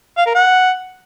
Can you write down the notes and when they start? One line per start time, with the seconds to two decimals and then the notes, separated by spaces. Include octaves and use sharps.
0.17 F5
0.26 A#4
0.35 F#5